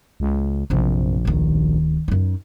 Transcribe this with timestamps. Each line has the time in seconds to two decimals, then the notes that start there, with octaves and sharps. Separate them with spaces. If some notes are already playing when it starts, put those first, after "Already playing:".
0.20 C#2
0.70 A#1 F#2 C3
1.25 D1 D#3
2.08 F#2 D#4